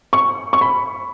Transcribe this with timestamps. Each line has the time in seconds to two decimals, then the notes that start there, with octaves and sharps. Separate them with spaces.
0.13 C#6
0.53 C#6
0.61 B5